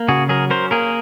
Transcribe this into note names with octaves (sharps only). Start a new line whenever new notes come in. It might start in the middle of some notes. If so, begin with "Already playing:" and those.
Already playing: A#3
C#3 F#4 G#4
F#3 G#4 A#4
C#4 A#4 C5
A#3 G#4 A#4